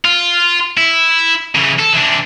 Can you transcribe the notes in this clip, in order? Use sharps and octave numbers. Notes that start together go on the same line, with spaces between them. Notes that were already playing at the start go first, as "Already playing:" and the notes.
F4
E4
C#3 E3
A4
E3 D4